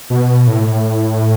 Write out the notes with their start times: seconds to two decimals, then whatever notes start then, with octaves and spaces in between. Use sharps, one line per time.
0.10 B2
0.47 A2